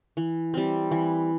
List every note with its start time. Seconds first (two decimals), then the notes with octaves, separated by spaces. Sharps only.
0.17 E3
0.54 G3 C4
0.91 E3